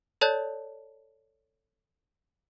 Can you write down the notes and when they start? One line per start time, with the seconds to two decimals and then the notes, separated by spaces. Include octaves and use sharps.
0.21 A4 C#5 D5 A5 F#6 G6